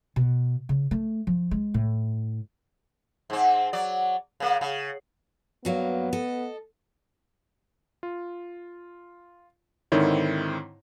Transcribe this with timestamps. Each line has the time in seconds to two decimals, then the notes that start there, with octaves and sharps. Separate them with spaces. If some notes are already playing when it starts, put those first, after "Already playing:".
0.16 B2
0.69 C#3
0.91 A3
1.27 F3
1.51 G#3
1.74 A2
3.30 G#2 C4
3.73 F#3 D5
4.40 C#3 A#3
4.61 C#3
5.65 G2 F#3 A#3 B3
6.13 A4 D#5
8.03 F4
9.92 G#2 D3 D#3 C4 E4 C#5